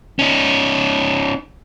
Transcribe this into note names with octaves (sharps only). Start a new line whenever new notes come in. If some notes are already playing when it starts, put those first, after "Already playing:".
C#4 D#4